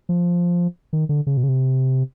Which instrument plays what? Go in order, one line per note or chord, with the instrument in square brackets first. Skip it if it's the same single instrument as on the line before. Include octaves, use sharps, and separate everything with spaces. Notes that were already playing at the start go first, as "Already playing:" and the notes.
[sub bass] F3
D#3
D3
C#3
B2
C#3
C3